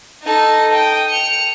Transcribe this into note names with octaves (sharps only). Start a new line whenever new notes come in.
D#4 A4
G5 D#6
C#7 F7